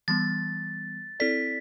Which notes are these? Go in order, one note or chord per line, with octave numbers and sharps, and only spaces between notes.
E3 G3 B3 A6
C4 E4 A4 D5 B6